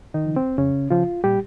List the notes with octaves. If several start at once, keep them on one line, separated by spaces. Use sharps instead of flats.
D#3 D#4
C#3 F3
C4
F2 C#3 C#4
C#3 F3 F4
A#2 G3 G4